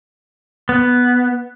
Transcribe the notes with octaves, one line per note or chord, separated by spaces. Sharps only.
B3